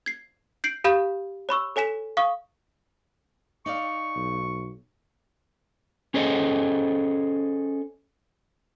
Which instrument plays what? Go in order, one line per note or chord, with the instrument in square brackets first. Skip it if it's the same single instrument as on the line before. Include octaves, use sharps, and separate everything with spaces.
[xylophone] G#6 C7
G6 C7 D7 F#7
G4 F5 B5 D#6 G6 E7
C#5 B5 C#6 E6
A4 C#5 G#5 B6 E7
F5 C#6 D#6
[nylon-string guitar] D#4 D5 F5 [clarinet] C#6
[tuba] B1
[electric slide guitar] C#4 G#4 A4 C5 C#5 D#5